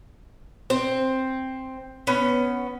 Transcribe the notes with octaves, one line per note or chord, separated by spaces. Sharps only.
C4
B3 C#4